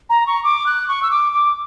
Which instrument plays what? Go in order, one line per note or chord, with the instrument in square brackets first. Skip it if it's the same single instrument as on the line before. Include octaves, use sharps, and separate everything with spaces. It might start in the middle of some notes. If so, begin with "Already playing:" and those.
[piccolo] A#5
C#6
D6
F#6
C#6
E6
D6
D6